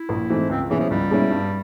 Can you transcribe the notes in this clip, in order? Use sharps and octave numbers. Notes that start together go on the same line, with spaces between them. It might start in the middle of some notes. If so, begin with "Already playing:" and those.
Already playing: E4
A#1
G#2 E3 A3 C4
C#2 C4
B2 E3 G#3 C#4 E4
F3
C#2 G3
B2 G#3 C#4 E4
G2